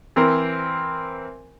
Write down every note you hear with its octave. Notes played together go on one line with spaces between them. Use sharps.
E3 C4 A#4 C5